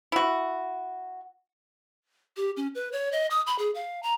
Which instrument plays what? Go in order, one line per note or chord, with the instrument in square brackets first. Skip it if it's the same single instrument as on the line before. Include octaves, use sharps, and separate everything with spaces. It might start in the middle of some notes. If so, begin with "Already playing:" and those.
[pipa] E4 F#4
[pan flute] G4
C#4
B4
C#5
D#5
D#6
B5
G#4
F5
A#5